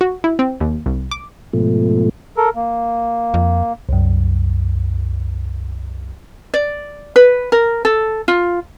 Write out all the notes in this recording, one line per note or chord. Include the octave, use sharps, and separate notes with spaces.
F#4
E4
C4
D#2
C2
D6
G#2 B2 F3 A3
A4 A#4
A#3
F2
C2 F#2
D5
B4
A#4
A4
F4